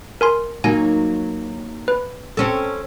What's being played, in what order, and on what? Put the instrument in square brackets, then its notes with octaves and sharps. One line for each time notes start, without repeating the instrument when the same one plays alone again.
[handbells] A#4 G#5 C6
[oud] F#3 A#3 D#4 [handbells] G#5
[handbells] B4
[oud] C4 C#4 A4